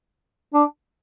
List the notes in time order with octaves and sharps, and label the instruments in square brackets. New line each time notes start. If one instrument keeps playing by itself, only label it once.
[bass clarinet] D4